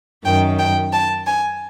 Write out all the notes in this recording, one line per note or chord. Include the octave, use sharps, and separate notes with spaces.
F#2 D#3 G5
G5
A5
G#5